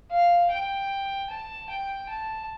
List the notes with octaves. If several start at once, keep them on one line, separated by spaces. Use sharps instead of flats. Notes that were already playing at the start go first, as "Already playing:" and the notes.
F5
G5
A5
G5
A5